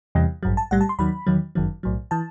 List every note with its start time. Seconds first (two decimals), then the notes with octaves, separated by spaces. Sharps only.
0.15 E2 C3 E3 G3
0.43 A1 G2 F#3
0.57 A5
0.71 B1 A2 G3 F#5
0.81 A5
0.89 C6
0.99 D#2 D#3 F#3 B5
1.27 E2 D#3 F#3
1.55 G1 F#2 D#3 F#3
1.83 B1 A2 F#3
2.11 E3 A5